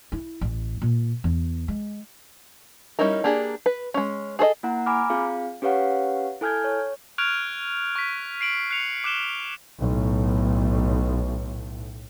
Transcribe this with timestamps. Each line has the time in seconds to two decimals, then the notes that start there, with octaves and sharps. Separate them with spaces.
0.12 E4
0.41 A1
0.82 A#2
1.24 E2
1.68 G#3
2.99 G3 C#4 D#4 E4 A#4
3.24 A#3 D4 G4 G#4
3.66 B4
3.94 G#3 C#4
4.39 G#4 A4 C5 D#5
4.63 A#3 E4 F#5 A#5
4.86 G#5 A#5 B5 D6 F6
5.10 C4 F4 G#4 F5
5.62 C#4 G4 B4 C#5 F5 F#5
6.41 E4 A4 G#5 F6 G6 G#6
6.64 C#5
7.18 C#6 F6 F#6 G#6 D7 F7
7.96 C#6 B6
8.41 C7 D7 F#7
8.71 F#6 C7 C#7 F7
9.04 D6 F#6 E7 G7
9.78 B1 A2